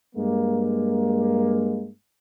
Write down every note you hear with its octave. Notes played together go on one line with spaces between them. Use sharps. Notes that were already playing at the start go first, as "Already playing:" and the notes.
G2 G#3 A#3